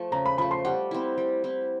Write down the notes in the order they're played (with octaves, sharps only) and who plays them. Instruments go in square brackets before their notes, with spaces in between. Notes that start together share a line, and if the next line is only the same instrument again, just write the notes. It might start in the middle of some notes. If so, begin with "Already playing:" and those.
Already playing: [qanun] F3 A3
[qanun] C#3 [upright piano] A#5
[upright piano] B5
[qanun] F3 A3 [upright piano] B5
[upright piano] C6
[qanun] G3 [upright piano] F#5
[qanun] C4 E4
G3
C4 E4